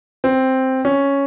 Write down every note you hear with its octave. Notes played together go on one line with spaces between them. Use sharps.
C4
C#4